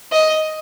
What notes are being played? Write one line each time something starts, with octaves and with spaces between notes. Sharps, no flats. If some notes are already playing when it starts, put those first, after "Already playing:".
D#5